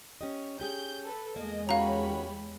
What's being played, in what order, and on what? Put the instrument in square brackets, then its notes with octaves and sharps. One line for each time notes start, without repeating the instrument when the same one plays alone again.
[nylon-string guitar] C#4 G4 D#5
[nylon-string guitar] C#4 G4 G#4 [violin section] G6
[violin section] A4 B4
[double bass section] E2 G#3 [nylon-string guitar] A#3 [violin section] D#5
[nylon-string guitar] C#4 F#4 A#4 [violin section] G4 C#5 B5 [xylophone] F5 A#5